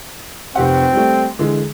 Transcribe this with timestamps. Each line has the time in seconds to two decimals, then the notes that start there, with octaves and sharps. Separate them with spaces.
0.55 F1 C4 G4 F#5
0.93 G3 A3
1.39 D3 E3 G#3